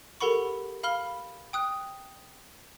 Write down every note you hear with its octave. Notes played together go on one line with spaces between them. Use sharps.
G4 A4 A#4 F#5 B5 C#6
F5 B5 F6 G7
G5 D#6 F#6